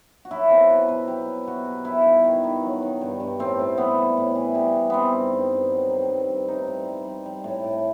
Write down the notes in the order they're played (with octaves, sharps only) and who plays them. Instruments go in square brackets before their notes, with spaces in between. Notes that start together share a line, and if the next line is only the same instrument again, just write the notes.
[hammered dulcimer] F#4
F#3 E4
B2 C4
B2 B4
B2 B4
F#3 G4
B2
B2 F#4
B2
D#3 E4
G2
D#3
D#3
F#3
D#3
G2
G2
A2 C4
A2
G3 B3
G3
A2
E3
G3
G3
D#3 B3 C4
G2
G2
G2
F#3
D#3
G2
G2
A2 D#4
G3
G3
G3
G3
A2
A2